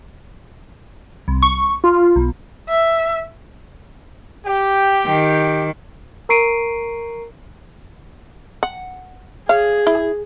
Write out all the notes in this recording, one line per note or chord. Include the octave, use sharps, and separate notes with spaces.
C2
C#6
F4
B1
E5
G4
D#3
A#4 A#5 C#6 C7 D7 D#7
F#5
G#4 C#5 F5
E4